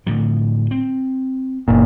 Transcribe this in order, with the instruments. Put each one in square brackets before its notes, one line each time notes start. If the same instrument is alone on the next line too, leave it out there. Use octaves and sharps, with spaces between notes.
[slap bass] A2 D3 F3
C4
[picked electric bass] F#1 A#2